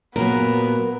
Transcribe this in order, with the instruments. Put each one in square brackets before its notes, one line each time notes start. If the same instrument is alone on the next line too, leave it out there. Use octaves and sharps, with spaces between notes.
[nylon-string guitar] A#2 F#3 [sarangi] B3 [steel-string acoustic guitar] A#4